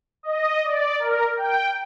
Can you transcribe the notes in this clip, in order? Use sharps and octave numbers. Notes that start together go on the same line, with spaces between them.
D#5
D5
A#4
G5